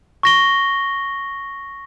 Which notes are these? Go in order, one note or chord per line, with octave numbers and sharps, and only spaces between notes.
C#6 A#6 G7